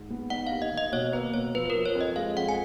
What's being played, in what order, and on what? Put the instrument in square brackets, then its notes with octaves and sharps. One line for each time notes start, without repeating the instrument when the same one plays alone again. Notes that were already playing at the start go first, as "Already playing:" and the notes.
Already playing: [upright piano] G#2
B3
[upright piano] D#4 [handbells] F#5
[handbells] F5
[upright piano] D#2
[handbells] D#5
[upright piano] D#3
[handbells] D#5
[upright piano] B2 [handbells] C#5
[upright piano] A#3 [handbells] B4
[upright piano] B2 [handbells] C#5
[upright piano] F3 [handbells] B4
[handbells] B4
A#4
[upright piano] F3
[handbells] C#5
[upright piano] F2
[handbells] D#5
[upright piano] G#3 [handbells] F5
[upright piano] F2 [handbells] F#5
[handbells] G#5